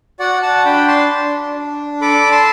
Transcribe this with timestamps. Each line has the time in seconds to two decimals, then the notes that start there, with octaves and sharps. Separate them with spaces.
0.20 F#4 D5 F#5
0.43 F#5 A5
0.65 D4 G5 B5
0.87 A5 C6
1.11 D4
1.56 D4
2.01 A4 B5 D6
2.23 B5
2.32 A5 C6